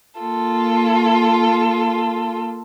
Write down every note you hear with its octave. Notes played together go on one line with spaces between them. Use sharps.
A#3 F4 A4